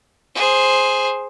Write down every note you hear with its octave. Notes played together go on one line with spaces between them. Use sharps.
G#4 C5